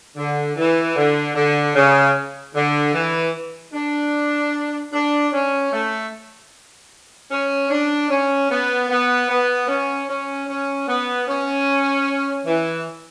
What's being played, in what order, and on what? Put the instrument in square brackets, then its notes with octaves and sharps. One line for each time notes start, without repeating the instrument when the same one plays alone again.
[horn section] D3
E3
D3
D3
C#3
D3
E3
D4
D4
C#4
A3
C#4
D4
C#4
B3
B3
B3
C#4
C#4
C#4
B3
C#4
E3